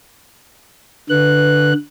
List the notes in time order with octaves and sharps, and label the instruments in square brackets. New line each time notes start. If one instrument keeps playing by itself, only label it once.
[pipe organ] D3 F#6 [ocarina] B4